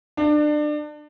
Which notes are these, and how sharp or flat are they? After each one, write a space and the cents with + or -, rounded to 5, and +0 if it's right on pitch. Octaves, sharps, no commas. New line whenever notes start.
D4 +30